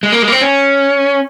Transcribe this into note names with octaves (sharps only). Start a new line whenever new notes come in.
G#3
A#3
G#3
A#3
C4
C#4